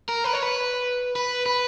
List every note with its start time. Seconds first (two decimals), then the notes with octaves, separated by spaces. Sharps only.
0.09 A#4
0.24 B4
0.33 C#5
0.42 B4
1.16 B4
1.46 B4